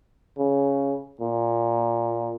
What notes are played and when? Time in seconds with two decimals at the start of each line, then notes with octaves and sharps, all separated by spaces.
0.38 C#3
1.21 A#2